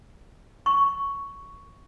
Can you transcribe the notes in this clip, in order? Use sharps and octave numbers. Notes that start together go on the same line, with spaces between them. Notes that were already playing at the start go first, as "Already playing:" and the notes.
C#6